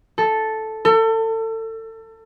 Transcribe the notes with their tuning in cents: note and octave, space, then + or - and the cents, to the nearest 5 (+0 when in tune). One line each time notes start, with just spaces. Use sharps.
A4 -5
A4 +30